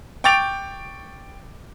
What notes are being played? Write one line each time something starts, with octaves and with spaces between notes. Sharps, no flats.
G5 C#6 D6 A6 D7 F7